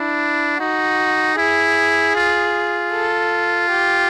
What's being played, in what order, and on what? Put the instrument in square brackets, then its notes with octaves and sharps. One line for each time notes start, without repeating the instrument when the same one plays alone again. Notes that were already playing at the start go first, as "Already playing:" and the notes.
Already playing: [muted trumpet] D4 [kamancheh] E4
[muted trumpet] D#4 [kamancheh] F#4
[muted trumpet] E4 [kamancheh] G#4
[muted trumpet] F4
[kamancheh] A4
G4